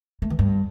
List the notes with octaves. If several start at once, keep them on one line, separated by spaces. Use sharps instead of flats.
A3
E3
G2